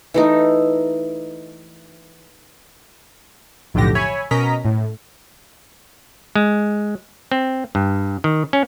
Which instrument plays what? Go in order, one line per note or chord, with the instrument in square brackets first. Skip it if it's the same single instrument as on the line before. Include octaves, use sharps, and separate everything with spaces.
[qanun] E3 A3 D#4
[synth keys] B1 F2 A2 D3 G4 A#6
C#5 E5 G#5 B5
B2 C#4 A#4 D#5 A#5 B6
A2
[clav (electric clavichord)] G#3
C4
G2
D#3
C#4